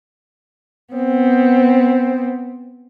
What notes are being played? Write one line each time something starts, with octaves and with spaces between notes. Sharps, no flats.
B3 C4